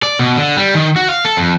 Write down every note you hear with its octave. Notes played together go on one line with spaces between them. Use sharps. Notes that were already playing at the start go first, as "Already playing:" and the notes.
D5
B2
D3
G3
D#3
F#4
F5
A4
F2